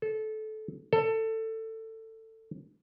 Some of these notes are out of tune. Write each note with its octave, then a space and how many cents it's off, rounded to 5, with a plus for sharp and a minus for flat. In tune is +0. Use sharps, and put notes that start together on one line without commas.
A4 -20
A4 +20